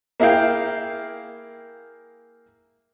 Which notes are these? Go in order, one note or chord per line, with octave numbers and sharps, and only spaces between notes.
A#3 E4 G#4 F5 G5